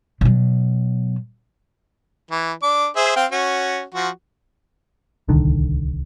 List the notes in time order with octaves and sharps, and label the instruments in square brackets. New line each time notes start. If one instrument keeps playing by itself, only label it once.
[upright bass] B2 F#3
[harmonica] E3
D4 D6
G#4 C5 E5
C4 F5 G5
C#4 F#4
F3 F#4
[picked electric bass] D1 C2 D3 D#3